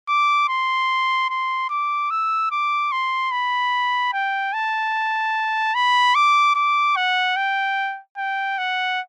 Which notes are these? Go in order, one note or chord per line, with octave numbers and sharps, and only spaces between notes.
D6
C6
C6
D6
E6
D6
C6
B5
G5
A5
B5
D6
D6
F#5
G5
G5
F#5